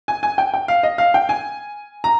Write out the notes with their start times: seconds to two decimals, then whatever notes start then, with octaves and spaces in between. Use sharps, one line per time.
0.08 G#5
0.23 G#5
0.38 G5
0.54 G5
0.68 F5
0.83 D#5
0.98 F5
1.14 G5
1.29 G#5
2.04 A#5